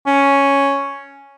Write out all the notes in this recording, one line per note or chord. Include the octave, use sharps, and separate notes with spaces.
C#4